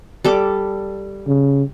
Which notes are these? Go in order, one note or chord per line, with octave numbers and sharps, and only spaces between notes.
G3 A4 D6
C#3